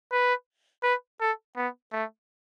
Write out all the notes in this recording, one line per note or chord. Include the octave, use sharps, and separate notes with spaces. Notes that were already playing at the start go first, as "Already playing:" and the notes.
B4
B4
A4
B3
A3